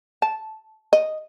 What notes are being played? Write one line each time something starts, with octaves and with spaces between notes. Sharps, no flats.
A5
D#5